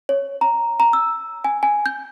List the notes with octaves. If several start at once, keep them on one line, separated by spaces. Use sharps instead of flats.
C#5
A#5
A#5
E6
G#5
G#5
G6